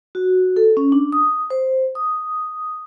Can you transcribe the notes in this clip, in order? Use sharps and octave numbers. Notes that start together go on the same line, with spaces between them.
F#4
A4
C#4
D4
D#6
C5
D#6